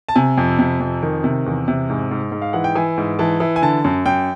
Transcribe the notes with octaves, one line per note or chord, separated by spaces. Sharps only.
A5
C3 G#5
F2
C3
F2
D#3
C3
E2
C3
G#2
G#2
G#2
F5
E3 F#5
G5
E3 G#5
G#2
E3 A5
E3
G#5
D3 A5
F#2
F#2 G5